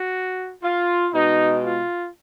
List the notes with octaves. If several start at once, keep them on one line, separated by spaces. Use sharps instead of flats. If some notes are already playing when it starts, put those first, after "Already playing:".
Already playing: F#4
F4
B2 G#3 D#4
F4